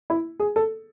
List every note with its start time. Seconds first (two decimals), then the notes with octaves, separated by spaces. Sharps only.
0.10 E4
0.40 G#4
0.56 A4